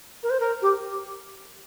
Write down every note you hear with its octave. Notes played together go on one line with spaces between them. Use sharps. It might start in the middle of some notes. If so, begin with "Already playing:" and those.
A#4
C5
A#4
G4